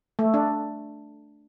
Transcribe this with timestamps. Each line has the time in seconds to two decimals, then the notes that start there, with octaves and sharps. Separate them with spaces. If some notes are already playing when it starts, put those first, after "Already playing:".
0.19 A3
0.34 D4